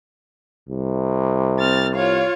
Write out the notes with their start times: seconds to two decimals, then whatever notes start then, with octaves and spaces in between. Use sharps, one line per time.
0.69 C2
1.59 C4 F6 A6
1.95 F4 C#5 F5